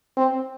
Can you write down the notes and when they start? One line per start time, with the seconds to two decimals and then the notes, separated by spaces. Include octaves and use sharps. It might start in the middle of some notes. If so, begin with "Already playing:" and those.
0.17 C4